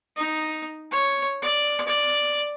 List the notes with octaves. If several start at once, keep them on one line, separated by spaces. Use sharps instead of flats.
D#4
C#5
D5
D5